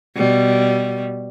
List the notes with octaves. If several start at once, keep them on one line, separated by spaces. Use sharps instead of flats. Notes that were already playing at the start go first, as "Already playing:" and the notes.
B2 G3